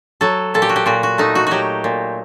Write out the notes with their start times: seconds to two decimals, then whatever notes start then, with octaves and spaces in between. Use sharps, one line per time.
0.21 F#3 A4
0.54 A#2 A4
0.62 G4
0.69 F#4
0.76 G4
0.86 A#2 F#4
1.03 F#4
1.18 A3 D#4
1.35 F#4
1.47 F#3 F#4 G4
1.84 A#2